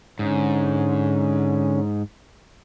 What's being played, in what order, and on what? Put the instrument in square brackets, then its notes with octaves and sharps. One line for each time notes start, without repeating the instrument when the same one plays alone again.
[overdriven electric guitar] G#2 [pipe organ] D3 C#4